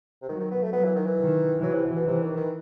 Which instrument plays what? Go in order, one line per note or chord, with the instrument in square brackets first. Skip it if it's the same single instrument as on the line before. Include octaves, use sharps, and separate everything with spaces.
[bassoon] C3
[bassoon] D#3 [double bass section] F#3
[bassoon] D#3
B3
A3
[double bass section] F#3 [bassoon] B3
[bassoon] E3
D#3
E3
[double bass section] D#3
[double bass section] E3 [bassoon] F#3
[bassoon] C3
B2
B2
[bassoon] C3 [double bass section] E3
[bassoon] D#3
D#3